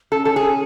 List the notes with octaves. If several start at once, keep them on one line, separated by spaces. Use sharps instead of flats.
C#4 A4
A4
G#4